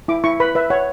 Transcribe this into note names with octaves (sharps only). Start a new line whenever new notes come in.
E4 D6
E4 C#6
B4 B5
B4 E5
C#5 F#5